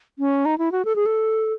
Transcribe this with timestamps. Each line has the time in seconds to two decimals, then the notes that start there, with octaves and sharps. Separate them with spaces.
0.19 C#4
0.45 D#4
0.58 E4
0.72 F#4
0.85 A4
0.96 G#4
1.06 A4